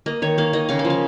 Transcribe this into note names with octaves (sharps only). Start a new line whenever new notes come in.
A#3 D#5
D#3 C#5
A#3 F5
D#3 D#5
C#3 F5
F5
F3
F5